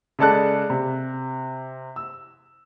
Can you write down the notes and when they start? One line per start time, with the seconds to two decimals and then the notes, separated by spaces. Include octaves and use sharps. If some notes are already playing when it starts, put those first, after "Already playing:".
0.19 C#3 G#3 A4 D5 A5 F#6
0.70 C3
1.96 E6